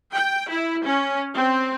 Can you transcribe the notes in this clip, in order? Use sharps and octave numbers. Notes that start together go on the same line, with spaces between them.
G5
E4
C#4
C4